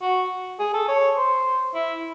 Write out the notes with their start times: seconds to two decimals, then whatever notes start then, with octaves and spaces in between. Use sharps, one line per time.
0.02 F#4
0.59 G#4
0.74 A4
0.88 C#5
1.17 C5
1.74 E4